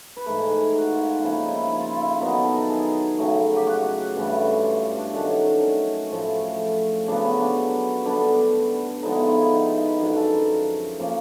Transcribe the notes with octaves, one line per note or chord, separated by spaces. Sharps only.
B4
G#2 E3 A3 A#4
G#4
A#4
G#4
F#4
F4
F4
C#3 F3 A#3 C#4 E4
D#4
E4
E4
F4
E4
F4
E4
D#3 F#3 B3 D#4
A4
A#4
A4
G#4
C#3 F#3 A3
G4
F#4
G2 E3 A3 C#4
F4
C#4 D4
D#3 F#3 A3 C#4 D4
C#4
D4
C#4
A2 F3 A3
C#3 F#3 B3 D4
C#4
D4
D3 G3 B3 D4
D3 F3 G#3 B3 D#4
E4
F4
E4
D#4
F4
G4
F#2 D3 F3 G#4
A4
A#4
F3 A#3 C#4